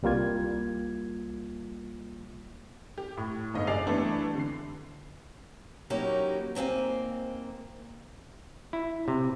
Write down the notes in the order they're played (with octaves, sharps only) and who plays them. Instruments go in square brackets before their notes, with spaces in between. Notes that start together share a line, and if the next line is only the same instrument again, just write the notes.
[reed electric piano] C2 G3 A#3 F4 G#6
[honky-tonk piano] G4
A2
G1 G#2 D#5 F5
F#1 G4 D5 G#5 C7 F7
E3 G3 A3 B3 D4
D3 C7
[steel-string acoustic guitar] F#3 A#3 C#4 D#4 E4 G4
G#2 A#3 C4 F5 G#5
[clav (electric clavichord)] E4
C3